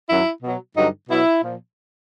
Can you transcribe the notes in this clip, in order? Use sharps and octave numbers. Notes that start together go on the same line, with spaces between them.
F#2 D#3 F#3 E4
B2 F#3
G2 D3 F#3 D#4
B2 F#3 E4
A#2 F3